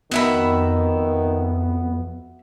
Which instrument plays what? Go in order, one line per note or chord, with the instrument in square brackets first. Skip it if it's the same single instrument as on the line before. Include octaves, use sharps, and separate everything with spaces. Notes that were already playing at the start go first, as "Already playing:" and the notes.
[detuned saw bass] F2 [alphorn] D#3 [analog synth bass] B3 [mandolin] F#4 E5 B5